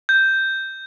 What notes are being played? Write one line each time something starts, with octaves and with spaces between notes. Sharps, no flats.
G6